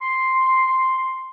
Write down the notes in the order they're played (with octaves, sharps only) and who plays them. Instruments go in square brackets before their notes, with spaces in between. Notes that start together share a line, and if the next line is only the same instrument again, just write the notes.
[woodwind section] C6